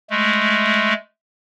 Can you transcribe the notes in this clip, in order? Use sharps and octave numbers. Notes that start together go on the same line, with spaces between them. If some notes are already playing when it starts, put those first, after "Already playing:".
G#3 A3